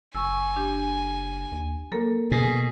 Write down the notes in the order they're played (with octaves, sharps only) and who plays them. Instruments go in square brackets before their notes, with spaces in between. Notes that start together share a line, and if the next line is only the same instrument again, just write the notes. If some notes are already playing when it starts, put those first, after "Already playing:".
[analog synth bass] F#1 [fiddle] G#5 [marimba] C#6 E6
[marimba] D4 G4
[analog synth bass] D#2
[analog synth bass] F#3 [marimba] A#3 A4 A#4
[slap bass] B2 [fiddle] G#4